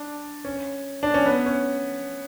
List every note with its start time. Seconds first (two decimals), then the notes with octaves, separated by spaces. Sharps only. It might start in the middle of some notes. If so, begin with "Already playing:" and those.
Already playing: D4
0.45 C#4
1.03 D4
1.14 C#4
1.26 B3
1.46 C#4